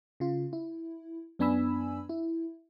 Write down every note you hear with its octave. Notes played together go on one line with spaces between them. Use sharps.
C#3 F4
E4
F#2 B3 D4 G#5 B5 E6
E4